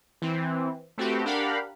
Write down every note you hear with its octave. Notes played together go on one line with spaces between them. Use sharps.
E3 C4
A3 C4 F#4 G4 B4
D4 G4 A#4 F5 F#5 B5